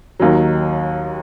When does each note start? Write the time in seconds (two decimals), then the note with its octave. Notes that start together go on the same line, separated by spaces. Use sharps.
0.20 D#2 D#3 F#3